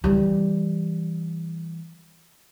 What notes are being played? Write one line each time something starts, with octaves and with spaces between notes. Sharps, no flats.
E3 G3